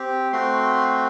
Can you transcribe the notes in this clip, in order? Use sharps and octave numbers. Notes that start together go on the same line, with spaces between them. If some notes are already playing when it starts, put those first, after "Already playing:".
Already playing: C4 G4
A3 C4 F#4 C6